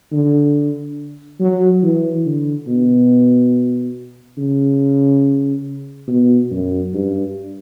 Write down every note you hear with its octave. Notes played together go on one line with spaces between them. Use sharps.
D3
F#3
E3
D3
B2
C#3
B2
F#2
G2